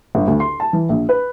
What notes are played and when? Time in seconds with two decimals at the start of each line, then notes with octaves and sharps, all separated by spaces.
0.15 G1
0.27 D2
0.40 C6
0.60 A5
0.73 E3
0.89 A#1
1.09 B4